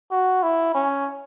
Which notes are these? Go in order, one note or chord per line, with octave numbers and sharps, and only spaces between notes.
F#4
E4
C#4